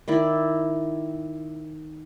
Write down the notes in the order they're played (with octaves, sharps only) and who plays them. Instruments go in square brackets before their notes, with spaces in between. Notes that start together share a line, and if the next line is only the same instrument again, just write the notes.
[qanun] D#3 E4 D5